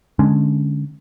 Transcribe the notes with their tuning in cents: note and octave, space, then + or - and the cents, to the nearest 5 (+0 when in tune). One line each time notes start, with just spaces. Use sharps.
D3 +0 G#3 +5 C#4 +0